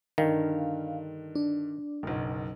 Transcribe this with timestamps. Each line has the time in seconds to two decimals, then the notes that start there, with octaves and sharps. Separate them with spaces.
0.18 G2 D3 D#3 F5
1.35 D4
2.03 F#1 B1